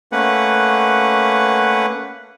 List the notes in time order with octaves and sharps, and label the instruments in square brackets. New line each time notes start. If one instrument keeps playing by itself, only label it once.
[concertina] A3 A#3 C#4 B4 F#5